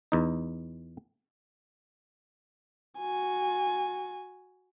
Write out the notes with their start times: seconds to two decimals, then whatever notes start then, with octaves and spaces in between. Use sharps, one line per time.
0.12 E2 D#4
2.99 F#4 G#5